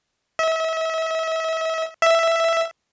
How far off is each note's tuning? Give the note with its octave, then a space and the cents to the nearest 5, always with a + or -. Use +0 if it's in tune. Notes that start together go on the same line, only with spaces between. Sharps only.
E5 -35
E5 +5